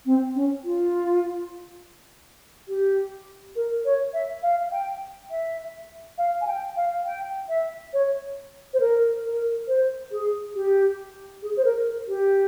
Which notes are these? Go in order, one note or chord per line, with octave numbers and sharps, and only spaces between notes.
C4
C#4
F4
G4
A#4
C#5
E5
F5
G5
E5
F5
G#5
G5
F5
G5
E5
C#5
C5
A#4
A#4
C5
G#4
G4
G#4
C5
A#4
G4